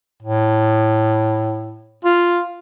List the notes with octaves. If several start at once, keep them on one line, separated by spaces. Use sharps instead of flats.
A2
F4